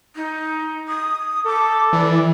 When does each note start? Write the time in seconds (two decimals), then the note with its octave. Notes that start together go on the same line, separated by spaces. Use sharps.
0.16 D#4
0.88 D#6
1.46 A4 D6
1.93 E3 D5